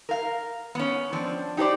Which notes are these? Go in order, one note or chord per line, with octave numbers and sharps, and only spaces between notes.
A#4 F5
B3 C#4
F3 C4 D4
D#4 G4 G#4 C5 D5